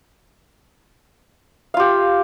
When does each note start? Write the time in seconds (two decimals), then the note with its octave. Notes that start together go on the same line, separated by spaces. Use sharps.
1.74 F5
1.77 F4
1.80 G4